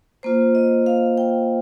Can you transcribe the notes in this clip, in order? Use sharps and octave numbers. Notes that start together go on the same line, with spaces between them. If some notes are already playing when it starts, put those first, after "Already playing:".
A#3 F4 C5
D#5
F5
G5